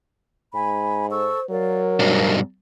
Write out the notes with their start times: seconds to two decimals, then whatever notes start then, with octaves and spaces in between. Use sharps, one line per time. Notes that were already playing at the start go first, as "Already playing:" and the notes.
0.55 G#2 G#5 B5
1.10 A4 C5 C#6 E6
1.50 F#3 A#4 D5 F5
1.99 B1 G2 C5